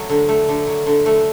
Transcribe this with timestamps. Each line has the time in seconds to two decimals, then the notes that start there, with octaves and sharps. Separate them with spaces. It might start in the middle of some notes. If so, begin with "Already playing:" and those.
Already playing: F#3 A3
0.10 D3
0.29 A3
0.49 D3
0.67 F#3
0.86 D3
1.06 A3